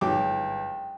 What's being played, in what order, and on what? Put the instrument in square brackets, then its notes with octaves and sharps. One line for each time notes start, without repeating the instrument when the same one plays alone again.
[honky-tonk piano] G1 [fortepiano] G#2 F#3 D6 [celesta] G5